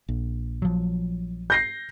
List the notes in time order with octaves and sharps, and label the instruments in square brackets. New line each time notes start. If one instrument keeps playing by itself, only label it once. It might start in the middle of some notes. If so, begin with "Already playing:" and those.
[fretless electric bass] A#1
[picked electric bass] F3 F#3
[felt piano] G6 A#6 C7